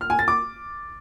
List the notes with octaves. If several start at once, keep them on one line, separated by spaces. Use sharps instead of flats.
F6
G#5
A6
D6